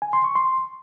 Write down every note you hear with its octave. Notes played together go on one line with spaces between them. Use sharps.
G#5
C6
C#6
C6